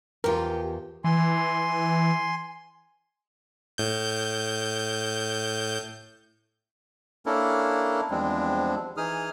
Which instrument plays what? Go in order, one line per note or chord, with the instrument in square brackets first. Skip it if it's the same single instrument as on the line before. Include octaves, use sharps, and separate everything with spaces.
[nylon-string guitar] E2 F4 [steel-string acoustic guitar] F3 G4 [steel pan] A#4
[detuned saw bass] E3 [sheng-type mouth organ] G#5 C6
[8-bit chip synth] A2 G6
[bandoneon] A#3 C#4 D4 E4 A4 A#4
E2 F3 G3 G#3 C4 D4
E3 D#4 G#4 D#6 F6